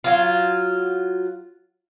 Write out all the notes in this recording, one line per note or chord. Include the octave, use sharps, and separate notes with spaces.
F#3 F4